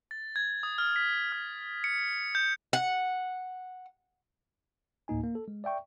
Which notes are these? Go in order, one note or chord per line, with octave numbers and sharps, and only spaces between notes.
A6
G#6
D#6
F6
B6
F6
C#7
G6
F#5
D2 A2 A#3 D#4 G#5
A#3
A4
G#3
D5 E5 G5 C#6